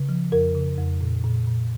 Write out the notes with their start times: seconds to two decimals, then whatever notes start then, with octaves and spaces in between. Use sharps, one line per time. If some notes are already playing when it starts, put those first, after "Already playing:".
Already playing: C#3
0.09 F3
0.32 F2 A#4
0.55 C#3
0.78 F2
1.01 A#2
1.24 A#2
1.47 A#2